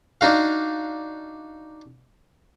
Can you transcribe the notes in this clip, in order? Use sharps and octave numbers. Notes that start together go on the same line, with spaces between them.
D4 D#4 F#4 F5